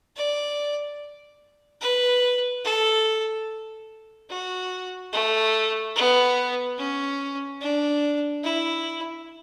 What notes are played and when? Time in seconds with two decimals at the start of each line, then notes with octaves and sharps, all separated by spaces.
0.16 D5
1.81 B4
2.64 A4
4.30 F#4
5.13 A3
5.95 B3
6.78 C#4
7.61 D4
8.43 E4